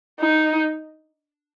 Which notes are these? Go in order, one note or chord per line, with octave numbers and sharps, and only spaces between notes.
D#4